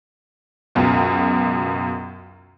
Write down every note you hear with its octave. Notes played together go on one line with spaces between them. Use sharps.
C#2 F#2 B2